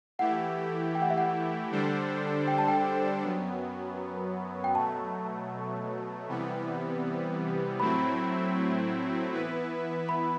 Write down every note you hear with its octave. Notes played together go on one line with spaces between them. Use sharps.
E3 A3 E4 G4 F#5
G5
F#5
E5
F#5
D3 G3 D4 A4 C5
G5
A5
G5
F#2 F#3 B3
G5
B2 F#3 A3 A5
C3 E3 G3 B3
A2 F#3 A3 C4 E4 B5
E3 B3 E4 B4
B5